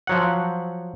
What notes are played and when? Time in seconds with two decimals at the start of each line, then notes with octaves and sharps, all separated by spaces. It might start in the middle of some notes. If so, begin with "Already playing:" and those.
0.07 F3 F#3 F#5